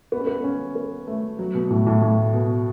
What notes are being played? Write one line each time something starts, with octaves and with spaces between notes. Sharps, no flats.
B3
C#4
B3
C#4
B3
A3
F#3
B2
A2
A2
A2
B2